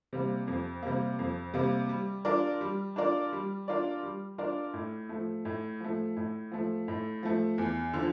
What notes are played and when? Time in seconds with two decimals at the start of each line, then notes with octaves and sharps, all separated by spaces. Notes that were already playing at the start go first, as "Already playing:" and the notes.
0.13 C3 G3 A#3
0.48 F2
0.83 C3 G3 A#3
1.19 F2
1.54 C3 G3 A#3
1.89 G3
2.25 D4 F4 A#4 D5
2.61 G3
2.96 D4 F4 A#4 D5
3.33 G3
3.68 D4 F4 A#4 D5
4.03 G3
4.38 D4 F4 A#4 D5
4.74 A2
5.09 F3 A3
5.45 A2
5.81 F3 A3
6.17 A2
6.52 F3 A3
6.88 A2
7.23 F3 A3
7.58 E2
7.93 D3 F3